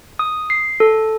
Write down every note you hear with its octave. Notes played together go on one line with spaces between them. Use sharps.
D#6
C7
A4